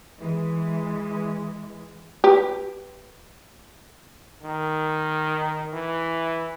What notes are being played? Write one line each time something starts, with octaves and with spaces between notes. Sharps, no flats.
E3 G#3
G4 B4
D#3
E3